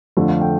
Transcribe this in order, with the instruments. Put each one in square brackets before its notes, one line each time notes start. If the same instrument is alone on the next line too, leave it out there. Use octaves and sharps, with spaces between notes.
[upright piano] F2 D3 A3 D4 F4
F5
G5